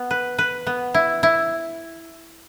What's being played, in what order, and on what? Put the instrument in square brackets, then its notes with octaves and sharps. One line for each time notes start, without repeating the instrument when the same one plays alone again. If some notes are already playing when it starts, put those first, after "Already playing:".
Already playing: [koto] B3
B4
B4
B3
E4
E4